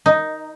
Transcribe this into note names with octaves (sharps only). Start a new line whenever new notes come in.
D#4